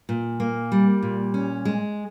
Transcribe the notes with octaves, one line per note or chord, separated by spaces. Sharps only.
A#2
A#3
G3
A#2
C#4
G#3